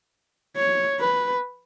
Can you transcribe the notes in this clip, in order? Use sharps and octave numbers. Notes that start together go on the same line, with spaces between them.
C#5
B4